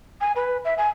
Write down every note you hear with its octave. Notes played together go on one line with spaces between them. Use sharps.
G#5
B4
E5
G#5